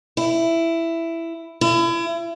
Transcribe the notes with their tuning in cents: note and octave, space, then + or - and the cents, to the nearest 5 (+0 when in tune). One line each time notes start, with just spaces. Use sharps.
E4 +10
E4 +35